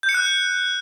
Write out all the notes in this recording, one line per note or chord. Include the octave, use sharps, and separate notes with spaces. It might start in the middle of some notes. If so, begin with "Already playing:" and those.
G6
C#7
F#6